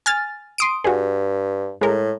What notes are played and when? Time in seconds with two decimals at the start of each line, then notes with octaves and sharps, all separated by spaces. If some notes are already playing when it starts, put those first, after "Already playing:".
0.06 G#5 F6 A6
0.58 C6 D#6 D7
0.84 G2 F#4 G#4
1.81 A2 G#3 A#4